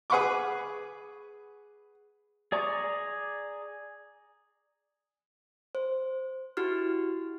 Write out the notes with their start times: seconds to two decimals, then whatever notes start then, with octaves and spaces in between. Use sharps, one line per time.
0.10 G#4 B4 F#5 B5 C#6 D6
2.52 G#4 D5 A#5 C#6
5.75 C5
6.57 E4 F#4 G4 F6